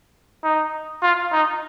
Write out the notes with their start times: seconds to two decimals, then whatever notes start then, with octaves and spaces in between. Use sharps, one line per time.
0.44 D#4
1.03 F4
1.33 D#4